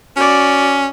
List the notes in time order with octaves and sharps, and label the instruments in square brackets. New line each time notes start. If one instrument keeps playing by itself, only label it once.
[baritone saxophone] C#4 [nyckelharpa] F#4 D5